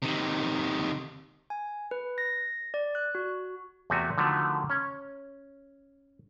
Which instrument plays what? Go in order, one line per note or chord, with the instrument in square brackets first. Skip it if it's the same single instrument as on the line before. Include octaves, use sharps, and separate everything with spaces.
[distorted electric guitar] C3 D#3
[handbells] G#5
B4
A#6
D5
F#6
F#4
[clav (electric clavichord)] E2 C3 A3 F#4 G#5
D3 D#3 F3 F#3 A3
C#4